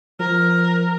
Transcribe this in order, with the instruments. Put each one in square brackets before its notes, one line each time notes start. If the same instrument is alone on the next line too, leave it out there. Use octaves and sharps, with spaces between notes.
[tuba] F3 [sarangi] A#4